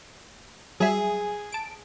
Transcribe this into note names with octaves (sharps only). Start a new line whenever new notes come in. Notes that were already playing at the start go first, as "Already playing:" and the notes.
F#3 G3 G#4 E5
A5 D7